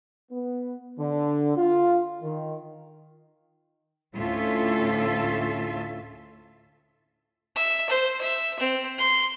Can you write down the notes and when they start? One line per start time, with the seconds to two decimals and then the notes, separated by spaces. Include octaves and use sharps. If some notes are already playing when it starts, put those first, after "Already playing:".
0.32 B3
0.99 D3
1.57 F4
2.22 D#3
4.15 D2 A2 C#4 F4 A4 E5
7.56 E5
7.89 C5
8.21 E5
8.59 C4
8.98 C6